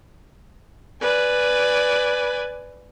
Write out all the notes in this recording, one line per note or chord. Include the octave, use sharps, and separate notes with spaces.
B4 D5 G#5